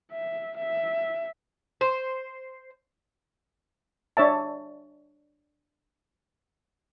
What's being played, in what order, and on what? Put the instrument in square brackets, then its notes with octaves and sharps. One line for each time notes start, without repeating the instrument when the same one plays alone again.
[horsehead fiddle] E5
E5
[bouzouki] C5
[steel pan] D4 C#5 E5 A5